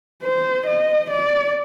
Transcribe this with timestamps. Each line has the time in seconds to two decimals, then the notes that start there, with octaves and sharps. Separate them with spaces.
0.23 C5
0.67 D#5
1.11 D5